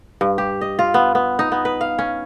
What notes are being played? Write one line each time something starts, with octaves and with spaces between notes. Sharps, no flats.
G2
G4
D#5
F4
B3
B3
D#4
B3
B4
F5
C#4